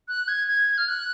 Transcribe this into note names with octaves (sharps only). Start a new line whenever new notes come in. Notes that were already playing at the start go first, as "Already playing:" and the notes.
F#6
G#6
G#6
F6
F#6